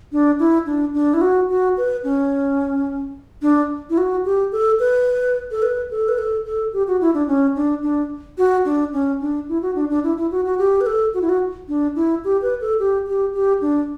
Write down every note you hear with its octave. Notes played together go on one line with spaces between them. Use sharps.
D4
E4
D4
D4
E4
F#4
F#4
B4
C#4
D4
E4
F#4
G4
A4
B4
A4
B4
A4
B4
A4
A4
G4
F#4
E4
D4
C#4
D4
D4
F#4
D4
C#4
D4
E4
F#4
D4
D4
E4
E4
F#4
F#4
G4
B4
A4
F#4
E4
F#4
D4
E4
G4
B4
A4
G4
G4
G4
D4